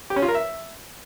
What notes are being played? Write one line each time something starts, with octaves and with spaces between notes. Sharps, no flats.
G4
C#4
F4
A#4
E5